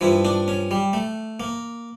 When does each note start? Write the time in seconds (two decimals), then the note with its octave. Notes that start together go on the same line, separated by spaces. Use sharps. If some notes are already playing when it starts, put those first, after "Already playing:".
0.01 G2 F3 E4
0.25 D4
0.48 C#4
0.71 G3
0.93 A3
1.40 A#3